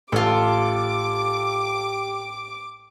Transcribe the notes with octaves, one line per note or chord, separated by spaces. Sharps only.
A1 F4 G4 A4 D6